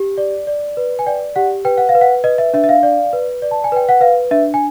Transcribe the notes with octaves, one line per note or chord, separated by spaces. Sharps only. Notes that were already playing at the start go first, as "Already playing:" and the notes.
Already playing: G4
D5
D5
B4
G#5
D5 G5
G4 F#5
B4 G5
F#5
F5
B4
F#5
B4 D#5
E5
D4 E5
E5
F5
D5
B4
D5
A5
G#5
B4 G5
F#5
B4 F5
D4 E5
G#5